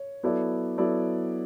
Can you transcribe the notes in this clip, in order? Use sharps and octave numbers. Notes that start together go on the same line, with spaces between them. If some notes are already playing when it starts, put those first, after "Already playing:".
Already playing: C#5
F#3 B3 E4 A4 D5
F#3 B3 E4 A4 D5